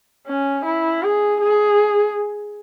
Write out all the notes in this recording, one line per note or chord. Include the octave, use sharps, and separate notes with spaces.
C#4
E4
G#4
G#4